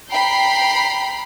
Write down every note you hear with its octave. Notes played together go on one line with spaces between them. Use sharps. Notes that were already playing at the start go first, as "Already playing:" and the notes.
G5 A#5 B5 C7